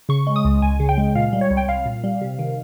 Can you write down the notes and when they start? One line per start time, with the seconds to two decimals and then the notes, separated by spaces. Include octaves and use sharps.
0.09 C#3 C#6
0.27 G#3
0.36 D#6
0.45 C#2
0.62 C#2 G#5
0.80 C#3
0.89 G5
0.98 G#3
1.15 A#2 F5
1.33 G3
1.41 C#5
1.51 C2
1.57 G5
1.68 C2 F5
1.86 A#2
2.04 G3
2.21 C3
2.39 D#3